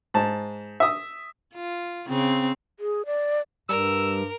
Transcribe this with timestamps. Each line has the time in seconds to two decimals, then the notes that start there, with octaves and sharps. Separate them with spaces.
0.14 G#2 A5
0.80 E5 D#6
1.55 F4
2.07 C#3 C4
2.80 G#4
3.06 D5
3.69 G2 G3 A#4 E6